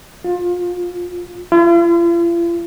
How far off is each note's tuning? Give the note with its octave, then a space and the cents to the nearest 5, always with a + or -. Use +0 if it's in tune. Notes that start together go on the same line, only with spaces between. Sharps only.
F4 +25
F4 -45